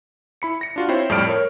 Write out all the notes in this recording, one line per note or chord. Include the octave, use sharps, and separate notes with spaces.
E4 B5 C#7
A#6 C#7
D4 F4 F#4
C4 E4 F4 C5 C#5 G5
F2 A2 G3 D5 F6 D7
A#4 C#5